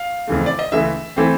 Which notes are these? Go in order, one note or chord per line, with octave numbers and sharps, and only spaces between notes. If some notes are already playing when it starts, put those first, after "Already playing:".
Already playing: F5
F2 C#3 E3 A3
D5
D#5
C#2 C#3 E3 A3 E5
E3 A3 C4